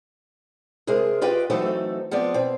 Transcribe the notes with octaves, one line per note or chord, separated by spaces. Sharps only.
C3 G#3 G#4 A#4
F4 G4 B4 D#5 G5
E3 F#3 A3 C4 D#4 A4
F3 B3 C4 D5
B2 C4